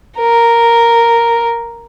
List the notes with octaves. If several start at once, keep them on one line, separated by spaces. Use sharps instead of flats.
A#4